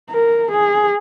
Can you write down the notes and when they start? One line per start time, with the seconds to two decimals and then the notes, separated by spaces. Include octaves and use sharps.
0.11 A#4
0.52 G#4